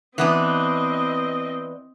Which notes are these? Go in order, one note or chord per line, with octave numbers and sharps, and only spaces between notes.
E3 B3 C4 D4 D#5